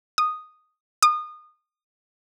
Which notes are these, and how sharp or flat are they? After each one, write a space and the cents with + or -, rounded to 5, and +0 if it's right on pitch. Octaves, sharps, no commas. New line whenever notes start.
D#6 -5
D#6 -25